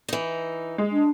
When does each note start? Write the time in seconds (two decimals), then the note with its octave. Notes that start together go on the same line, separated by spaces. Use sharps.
0.09 E3 D#4
0.78 G#3
0.91 D4